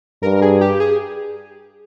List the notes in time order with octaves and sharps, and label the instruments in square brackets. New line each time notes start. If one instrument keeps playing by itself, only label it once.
[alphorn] G2 [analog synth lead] A#4
[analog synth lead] G#4
G4
G#4